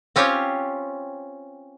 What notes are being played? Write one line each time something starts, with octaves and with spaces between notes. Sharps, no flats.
C4 C#4 F4 G4 C#5